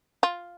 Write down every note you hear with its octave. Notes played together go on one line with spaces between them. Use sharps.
F4